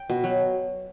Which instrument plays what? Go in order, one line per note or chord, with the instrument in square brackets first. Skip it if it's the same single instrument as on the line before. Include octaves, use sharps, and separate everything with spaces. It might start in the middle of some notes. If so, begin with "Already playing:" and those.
Already playing: [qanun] G5
B2
F#3